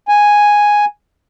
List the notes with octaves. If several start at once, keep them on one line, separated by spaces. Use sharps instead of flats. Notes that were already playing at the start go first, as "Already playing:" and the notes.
G#5